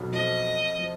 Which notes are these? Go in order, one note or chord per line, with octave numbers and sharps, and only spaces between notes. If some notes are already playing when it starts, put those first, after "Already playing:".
Already playing: B1 F2 B2 F3
F2 F3 D#5
F3